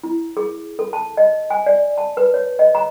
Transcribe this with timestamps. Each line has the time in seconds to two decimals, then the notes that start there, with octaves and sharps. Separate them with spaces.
0.03 E4
0.37 G#4
0.79 A4
0.93 A5
1.17 D#5
1.50 G#5
1.66 D5
1.98 A5
2.17 B4
2.34 C#5
2.59 D#5
2.75 A#5